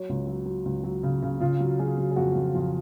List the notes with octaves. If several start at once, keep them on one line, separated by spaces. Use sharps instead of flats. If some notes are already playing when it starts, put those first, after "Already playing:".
Already playing: F#3 C#5
C#2
F#3
F#3
C#2
F#3
C#3
C#3
C#3 F4
F#3
F#3 G#4
F#3
G#4
F2 F#4
F2
F2 F4